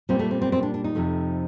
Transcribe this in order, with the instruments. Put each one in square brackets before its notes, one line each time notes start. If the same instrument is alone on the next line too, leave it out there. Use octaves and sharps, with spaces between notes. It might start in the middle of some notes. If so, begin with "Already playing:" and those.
[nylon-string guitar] A#2 G3 C4
A3
C4
C4
C4
D4
D4
D#4
F2 C3 F3 A3